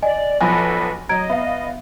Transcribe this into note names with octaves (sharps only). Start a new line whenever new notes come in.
D5 D#5 G#5
B1 F3 A4 B4 G#5 B5
F#3 D#5 A#5 G#6 D7
B3 E5 F5